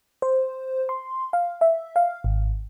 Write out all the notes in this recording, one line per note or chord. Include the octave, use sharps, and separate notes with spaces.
C5
C6
F5
E5
F5
G#1